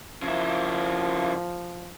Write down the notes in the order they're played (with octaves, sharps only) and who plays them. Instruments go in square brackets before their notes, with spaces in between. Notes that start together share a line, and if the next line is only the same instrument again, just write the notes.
[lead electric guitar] C#3 E4 [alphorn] F3